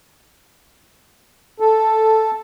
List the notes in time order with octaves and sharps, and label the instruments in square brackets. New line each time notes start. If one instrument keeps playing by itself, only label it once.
[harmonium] A4